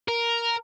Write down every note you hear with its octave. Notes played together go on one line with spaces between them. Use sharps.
A#4